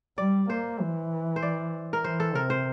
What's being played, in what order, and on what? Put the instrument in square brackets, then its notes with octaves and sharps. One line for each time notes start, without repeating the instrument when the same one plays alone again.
[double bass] G3 [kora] D5
[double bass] A#3 [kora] C5
[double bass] E3
[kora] C5
D5
A#4
[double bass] E3 [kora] C5
[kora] A4
[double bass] C3 [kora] A#4
[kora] C5